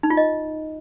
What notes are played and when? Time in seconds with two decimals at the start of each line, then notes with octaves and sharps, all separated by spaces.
0.03 D#4
0.10 F4
0.17 D#5